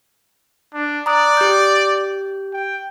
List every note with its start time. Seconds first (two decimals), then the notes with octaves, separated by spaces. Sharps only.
0.74 D4
1.06 D5 A#5 D#6 F#6
1.37 G4 G6
2.53 G5